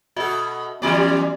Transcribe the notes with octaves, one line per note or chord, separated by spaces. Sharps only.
B2 F#4 A4 D#5 E5
E3 G3 B3 C#4 F#4 G4 D5